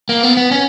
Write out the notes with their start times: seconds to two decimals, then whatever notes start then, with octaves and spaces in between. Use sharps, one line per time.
0.09 A#3
0.23 B3
0.37 B3
0.51 C#4